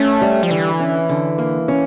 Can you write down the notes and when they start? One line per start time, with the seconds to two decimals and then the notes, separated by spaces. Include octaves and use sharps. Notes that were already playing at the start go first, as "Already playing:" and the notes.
Already playing: A3 C#4
0.21 G3
0.43 F3
0.50 D3 E3
0.80 C#4
1.09 D3
1.38 A#3
1.68 C#4